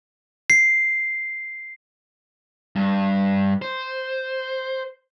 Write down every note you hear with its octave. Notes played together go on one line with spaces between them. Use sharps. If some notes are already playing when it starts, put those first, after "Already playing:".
C7
G2
C5